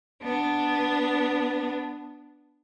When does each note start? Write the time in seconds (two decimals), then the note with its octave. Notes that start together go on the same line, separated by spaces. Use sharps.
0.22 B3 D4